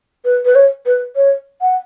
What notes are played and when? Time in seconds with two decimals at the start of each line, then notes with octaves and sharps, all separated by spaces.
0.24 B4
0.45 B4
0.55 C#5
0.86 B4
1.16 C#5
1.61 F#5